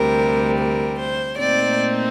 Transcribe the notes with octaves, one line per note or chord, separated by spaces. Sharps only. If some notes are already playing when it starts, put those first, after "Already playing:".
Already playing: D2 C3 G3 A#4
A#4
C5
A#2 A3 C4 D#4 D5